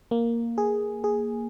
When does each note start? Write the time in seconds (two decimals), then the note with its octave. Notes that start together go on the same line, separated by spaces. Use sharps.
0.11 A#3
0.58 G#4
1.04 G#4